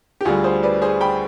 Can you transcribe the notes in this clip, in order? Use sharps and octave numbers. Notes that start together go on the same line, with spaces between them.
G4
D2 D3 G3 F4 G#4
G#4 C5
B4 D5
G#4 C5
G5 B5